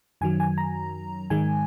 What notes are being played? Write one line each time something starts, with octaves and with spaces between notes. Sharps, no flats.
F#2 D#3 F#3 G#5
G#5
A#5
G#2 D#3 G#3 G#5